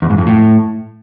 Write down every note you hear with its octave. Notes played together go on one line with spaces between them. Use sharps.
E2
G#2
F2
A2